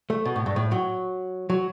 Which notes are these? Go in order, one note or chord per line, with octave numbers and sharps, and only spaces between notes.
A3
B2
A2
G2
A2
F#3
F#3